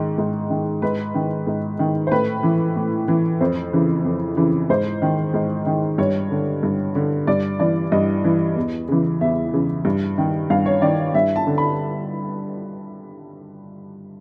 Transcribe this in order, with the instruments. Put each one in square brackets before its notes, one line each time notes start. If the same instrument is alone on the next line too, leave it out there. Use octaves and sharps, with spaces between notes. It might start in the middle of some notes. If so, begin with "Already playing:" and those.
Already playing: [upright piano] G#2 D#3
G#2
D#3
G#2 B4
D#3
G#2
D#3
C5
A2 B4
E3
A2
E3
F2 C5
C#3 E3
F2
C#3 E3
G#2 C5
D#3
G#2
D#3
G2 C#5
D3
G2
D3
G2 D5
E3 D5
G2 D#5
E3
E2
C#3 E3
E2 E5
C#3 E3
G2
D#3
G2 F5
C#5
D#3 D5
G2 E5
A5
D3
B5